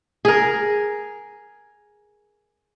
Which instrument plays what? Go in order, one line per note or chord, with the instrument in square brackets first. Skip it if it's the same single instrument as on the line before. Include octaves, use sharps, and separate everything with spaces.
[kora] G#4 A#4